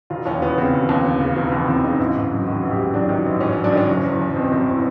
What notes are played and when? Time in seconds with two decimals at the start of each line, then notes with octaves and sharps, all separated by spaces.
0.10 E1 F4
0.26 D#2 C#4
0.42 E1 B3
0.57 C#3 C4
0.73 E1
0.89 D#2
1.05 E1
1.20 C#3
1.36 E1
1.52 D#2 B3
1.67 E1 C4
1.83 C#3 D#4
1.99 A1 E4
2.15 G#2
2.31 F#3
2.47 D#3 F#4
2.63 A1
2.70 G4
2.78 G#2
2.94 F#3 D4
3.09 D#3
3.26 A1
3.41 G#2 C#4
3.53 F#3 C#4
3.64 D4
3.72 D#3 C#4
3.88 F#1
4.04 E2
4.20 F#1
4.35 B2 C4
4.52 F#1 C4
4.67 E4